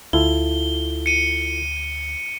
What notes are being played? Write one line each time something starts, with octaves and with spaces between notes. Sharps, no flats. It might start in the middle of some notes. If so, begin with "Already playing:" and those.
D2 E4 F4 A4 G7
C#7 D#7